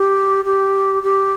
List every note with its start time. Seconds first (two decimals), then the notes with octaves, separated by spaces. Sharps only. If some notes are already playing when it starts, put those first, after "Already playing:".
Already playing: G4
0.45 G4
1.03 G4